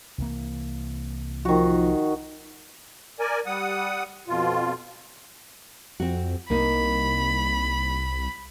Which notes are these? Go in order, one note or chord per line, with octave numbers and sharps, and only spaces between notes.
C2 E3 A#3
D#3 F3 F#4
A#4 D5 G#5
G3 F#5 D#6
F2 B2 F4
F2 C4 F#4
C2 A#3 D#4 B5